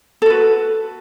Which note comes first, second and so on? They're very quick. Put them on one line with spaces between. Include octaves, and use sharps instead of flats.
A4 F#4 B4